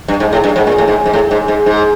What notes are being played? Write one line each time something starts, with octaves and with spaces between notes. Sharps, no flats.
G2
G#2
A2
G2
G#2
A#2
A2
G#2
G#2
A2
G#2
G#2
G#2